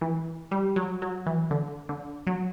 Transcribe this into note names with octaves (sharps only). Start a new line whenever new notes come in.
E3
G3
F#3
F#3
E3
D3
D3
F#3